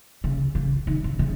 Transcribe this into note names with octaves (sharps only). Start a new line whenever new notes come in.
C#3
C#3
D#3
C#3
C#3